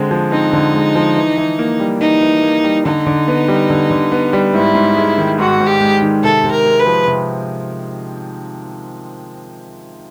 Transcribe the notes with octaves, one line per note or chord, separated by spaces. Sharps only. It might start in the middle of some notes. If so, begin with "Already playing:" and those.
Already playing: D3 G#3 C4
F3
C4 D#4
D3
G#3
F3
E3
E3
A#3
G3
E3 D#4
E3
A#3
G3
D3 D#4
D3
B3
G3
D3
D3
B3
G3
G#2 E4
G#2
G#3
D#3
G#2 F#4
G#2
G4
G#3
D#3
C3 A4
C3
A#4
G#3
B4
F3
C3